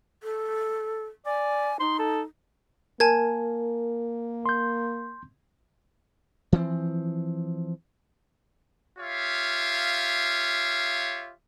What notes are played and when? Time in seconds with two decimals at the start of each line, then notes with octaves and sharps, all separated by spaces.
0.23 A4
1.26 D5 G#5
1.80 D#4 C6
1.99 A4
3.00 A#3 A#4 G#5 A5 G#6
4.46 C6 G6
6.52 E3 F3 B3 C4
8.99 F4 G4 C#5 E5 F5